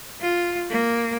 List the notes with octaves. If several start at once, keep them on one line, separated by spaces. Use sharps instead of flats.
F4
A#3